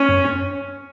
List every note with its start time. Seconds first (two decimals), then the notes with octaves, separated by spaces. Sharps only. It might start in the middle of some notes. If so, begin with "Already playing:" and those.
Already playing: C#4
0.09 F#2